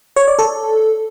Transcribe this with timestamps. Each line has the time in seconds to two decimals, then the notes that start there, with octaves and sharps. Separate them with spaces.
0.16 C#5
0.27 D5
0.39 A4